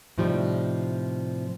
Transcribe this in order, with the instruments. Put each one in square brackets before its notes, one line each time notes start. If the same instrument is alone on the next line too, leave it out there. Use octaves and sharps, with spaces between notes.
[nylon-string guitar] A2 C3 F3 G3 D#4